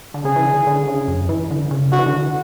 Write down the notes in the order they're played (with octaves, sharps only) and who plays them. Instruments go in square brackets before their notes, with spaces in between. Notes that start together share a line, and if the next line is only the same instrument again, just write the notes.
[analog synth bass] D3
[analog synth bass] C#3 [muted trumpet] G#4
[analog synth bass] E3
D3
D3
C#3
F#2
E3
D3
C#3
[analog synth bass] D3 [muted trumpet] F#4
[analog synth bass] E3
D3